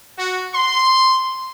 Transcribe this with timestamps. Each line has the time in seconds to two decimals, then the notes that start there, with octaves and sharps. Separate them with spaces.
0.18 F#4
0.54 C6